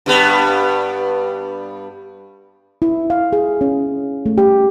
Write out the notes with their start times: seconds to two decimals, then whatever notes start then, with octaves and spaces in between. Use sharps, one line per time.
0.06 G2 G3 B3
2.82 E4
3.10 F5
3.33 G#4
3.61 C#4
4.26 A3
4.38 G4